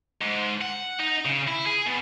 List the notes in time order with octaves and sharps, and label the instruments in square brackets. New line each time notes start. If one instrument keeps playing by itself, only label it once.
[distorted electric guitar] G#2
F#5
D#4
C#3
E4
G#4
B2